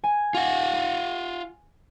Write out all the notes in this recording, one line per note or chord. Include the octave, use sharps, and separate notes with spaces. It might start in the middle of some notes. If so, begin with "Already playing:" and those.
G#5
F4 F#5